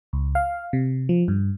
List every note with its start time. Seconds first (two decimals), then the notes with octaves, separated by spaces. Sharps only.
0.13 C#2
0.35 F5
0.73 C3
1.09 F3
1.28 G2